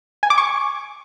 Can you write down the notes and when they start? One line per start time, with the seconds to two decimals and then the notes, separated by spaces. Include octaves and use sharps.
0.23 G#5
0.30 D6
0.38 C#6